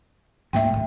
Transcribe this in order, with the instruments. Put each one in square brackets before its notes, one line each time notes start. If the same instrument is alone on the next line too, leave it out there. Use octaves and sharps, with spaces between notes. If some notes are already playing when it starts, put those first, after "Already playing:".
[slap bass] D2 G#2 A#3 [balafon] E5 G5
[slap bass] D#1 D#2 A2